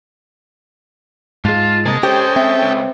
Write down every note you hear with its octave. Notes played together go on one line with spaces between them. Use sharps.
G#2 G#3 F4 A5
C3 A#3 G#4 D#5 A5
C#4 G4 A4 C5 G5
C4 E5
C#2